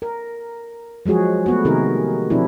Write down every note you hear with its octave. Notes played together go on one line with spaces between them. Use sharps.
A#4
F3 F#3 G#3 F#4 G#4
A3 B3 F#4
C3 D#3 D#4 G#4 A#4
B2 F3 C4 D4 E4